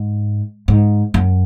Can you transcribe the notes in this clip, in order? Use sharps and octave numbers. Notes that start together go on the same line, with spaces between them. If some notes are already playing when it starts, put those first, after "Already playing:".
Already playing: G#2
G#2
F#2